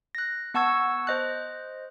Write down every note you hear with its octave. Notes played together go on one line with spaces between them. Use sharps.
F#6 A#6
B3 F#5 A5 C#6 E6 G#6
C5 D#5 F#6